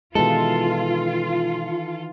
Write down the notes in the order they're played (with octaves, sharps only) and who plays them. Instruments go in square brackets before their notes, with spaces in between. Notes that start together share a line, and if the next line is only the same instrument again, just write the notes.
[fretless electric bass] B2 G#3 [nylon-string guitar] D#3 E3 [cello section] F4 [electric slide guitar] A4